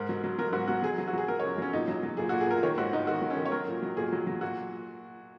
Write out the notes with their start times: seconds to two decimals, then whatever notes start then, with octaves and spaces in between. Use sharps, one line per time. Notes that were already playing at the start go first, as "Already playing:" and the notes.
Already playing: G#2 A#4
0.09 F#3
0.24 F#3
0.38 F#3 A#4
0.53 G#2 F#4
0.68 F#3 F#4
0.83 F#3 G#4
0.98 F#3
1.08 F#4
1.13 F#3 G#4
1.28 F#3 A#4
1.40 C#5
1.43 F#2
1.58 F#3 C#4
1.73 A#2 D#4
1.88 F#3
2.03 F#3
2.17 A#2 G#4
2.29 F#4
2.32 A#2
2.41 G#4
2.47 A#2 A#4
2.63 D#3 C#5
2.77 G#2 F#4
2.93 G#2 D#4
3.07 D#3 F#4
3.22 F#3
3.30 C#4
3.37 D#3
3.45 C#5
3.52 F#3 A#4
3.68 A#2
3.82 F#3
3.97 A#2 G#4
4.12 F#3
4.27 F#3
4.41 A#2 F#4